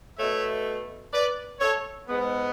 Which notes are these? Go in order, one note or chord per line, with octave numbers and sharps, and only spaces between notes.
B2 A3 C#5 E5
B4 D5
A4 C#5
G#2 G#3 B3